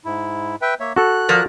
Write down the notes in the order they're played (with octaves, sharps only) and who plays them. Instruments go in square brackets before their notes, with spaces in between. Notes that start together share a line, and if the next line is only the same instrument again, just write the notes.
[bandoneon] G#2 E4
B4 E5 G5
A#3 C#5 E5
[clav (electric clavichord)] F#4 A4 [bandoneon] F#6
[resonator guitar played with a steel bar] F3 A#4 D5